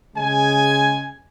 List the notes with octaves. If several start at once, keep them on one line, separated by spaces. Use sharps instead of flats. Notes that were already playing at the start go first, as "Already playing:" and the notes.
C#3 G#3 G#5